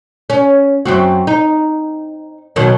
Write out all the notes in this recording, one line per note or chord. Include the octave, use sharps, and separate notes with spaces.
C#4
F#2 C4 F#4
D#4
B2 D#3 F#3